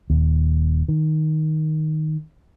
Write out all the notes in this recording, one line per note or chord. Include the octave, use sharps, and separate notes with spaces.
D#1 D#2
D#3